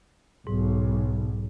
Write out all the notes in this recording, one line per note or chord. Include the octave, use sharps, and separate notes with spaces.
B1 G#2